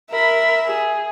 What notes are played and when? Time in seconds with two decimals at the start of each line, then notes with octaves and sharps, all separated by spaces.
0.11 A#4 E5 B5
0.65 G#4